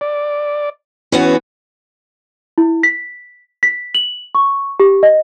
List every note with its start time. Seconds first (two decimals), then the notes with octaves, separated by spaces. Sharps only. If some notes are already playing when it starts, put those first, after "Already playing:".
0.01 D5
1.12 E3 B3 C#4 F#4
2.58 E4
2.83 B6
3.63 B6
3.95 F#7
4.35 C#6
4.80 G4
5.03 D#5